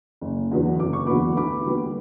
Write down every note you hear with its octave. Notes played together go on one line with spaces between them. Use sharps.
F#1
E2 D3 F#3 B3
F#1 D6
C#6
E2 D3 F#3 B3 B5 D6
D2 B5 D6
D3 G3 B3